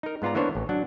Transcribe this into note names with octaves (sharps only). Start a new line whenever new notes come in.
D#4 A#4
G#2 B3 F4 D5 A#5
E3 A#3 B3 D4 C5 C#5
A1
F#3 D4 F#5